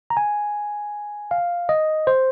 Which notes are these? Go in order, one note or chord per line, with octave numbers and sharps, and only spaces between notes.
A#5
G#5
F5
D#5
C5